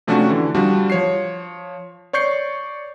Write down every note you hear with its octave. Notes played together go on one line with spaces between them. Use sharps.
C3 F3 A3 C#4 D4 F#4
D3 E3
F3 G3 D4 F#4
F3 C#5 C7
C#5 D5 C#6 G6 C7 C#7